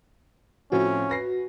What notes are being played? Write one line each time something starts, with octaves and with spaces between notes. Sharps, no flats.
A2 F3 C4 C#4 F#4
B4 A#6 C7